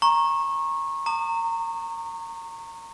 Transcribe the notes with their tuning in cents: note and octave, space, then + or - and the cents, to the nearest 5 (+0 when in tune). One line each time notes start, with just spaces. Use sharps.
A#5 +0 C#6 -25
A#5 -25 D#6 -40